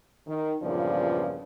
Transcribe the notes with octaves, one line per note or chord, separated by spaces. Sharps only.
D#3
E2 G2 A#2 C#3 F3 D5